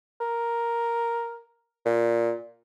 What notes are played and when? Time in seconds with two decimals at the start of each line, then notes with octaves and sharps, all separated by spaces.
0.21 A#4
1.86 A#2